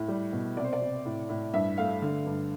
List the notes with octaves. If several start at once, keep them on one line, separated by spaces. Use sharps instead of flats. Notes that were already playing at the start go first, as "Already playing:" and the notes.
Already playing: A2
G3
B2
C3 D5
C5
D5
C3
A2
A2
G2 E5
A3 F5
D3
G2